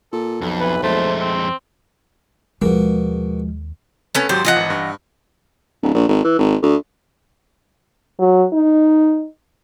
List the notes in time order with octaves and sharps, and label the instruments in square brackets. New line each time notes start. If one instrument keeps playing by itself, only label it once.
[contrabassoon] A#2 [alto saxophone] A4
[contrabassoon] B1 [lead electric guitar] F2
[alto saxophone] E3 [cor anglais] B4
[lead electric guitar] F2 G#3 [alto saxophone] A3 [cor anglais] C5
[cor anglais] C4
[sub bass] D#2 [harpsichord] B2 A#3 [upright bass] F3 [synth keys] G#3
[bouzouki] A3 B3 C#4
[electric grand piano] G#1 F#3 G4 [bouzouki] C5
[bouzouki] E3 D#5 F#5 [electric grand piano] F3 F4
[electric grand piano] G#1
G2
[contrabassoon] D1
A#1
G#1
E3
G#1
D2
[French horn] F#3
D#4